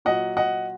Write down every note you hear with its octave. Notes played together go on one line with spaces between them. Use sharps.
A#2 F#3 D#5 F#5
D#5 F#5